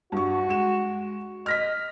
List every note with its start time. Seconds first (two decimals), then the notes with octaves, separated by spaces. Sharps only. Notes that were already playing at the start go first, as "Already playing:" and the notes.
0.12 G2 F#4 C#6
0.49 G#3 E7
1.46 D#5 F6 A#6 B6